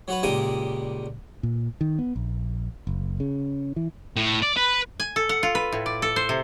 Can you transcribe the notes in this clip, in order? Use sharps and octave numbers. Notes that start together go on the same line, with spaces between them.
F#3 F#4 B4
C#2 A#2 G3 G4 A#4 D#6
A#2
D#3
B3
A#1
F#1
C#3
E3
A2
D5
B4
G#5
A4
F#5
F4
B4
A2
D5
A4
C5
C3